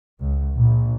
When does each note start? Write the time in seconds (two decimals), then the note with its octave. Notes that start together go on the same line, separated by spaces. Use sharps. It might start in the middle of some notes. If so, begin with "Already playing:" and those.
0.20 C#2
0.54 A#1